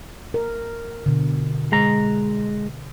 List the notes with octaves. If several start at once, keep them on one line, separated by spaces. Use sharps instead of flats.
A#4
B2 D3
G#3 A#5